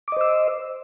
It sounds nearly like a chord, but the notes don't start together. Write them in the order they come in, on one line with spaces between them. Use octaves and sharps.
D6 D#5 C5 E6